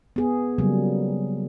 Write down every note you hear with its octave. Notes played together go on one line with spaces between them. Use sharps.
B3 G#4
C#3 F#3 G3 A#3